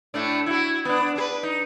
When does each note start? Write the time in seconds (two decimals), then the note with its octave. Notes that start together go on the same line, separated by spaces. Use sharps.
0.14 A2 A3 D4
0.46 E4 F#4
0.85 B3 D4
1.16 D4 G#4 B4
1.43 D#4